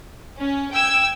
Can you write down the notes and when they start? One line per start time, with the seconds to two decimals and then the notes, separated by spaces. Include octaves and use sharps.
0.38 C#4
0.72 G5 E6 G#6